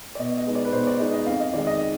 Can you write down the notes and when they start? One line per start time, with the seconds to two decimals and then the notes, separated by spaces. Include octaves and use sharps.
0.15 D5
0.19 B2 D#5
0.37 D#5
0.47 G#3 B3 D#4
0.55 D5
0.65 B4
0.73 B2 C5
0.87 D5
0.99 G#3 B3 D#4 D#5
1.13 D#5
1.27 F2 F5
1.40 D#5
1.54 D#3 G#3 D5
1.67 D#5